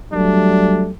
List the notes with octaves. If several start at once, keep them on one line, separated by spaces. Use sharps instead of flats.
F#3 G3 A3 D4